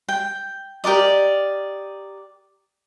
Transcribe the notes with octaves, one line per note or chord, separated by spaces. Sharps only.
G5
G4 A#4 D5 D#5